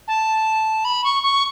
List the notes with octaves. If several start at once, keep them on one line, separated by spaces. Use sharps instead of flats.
A5
B5
C#6
C#6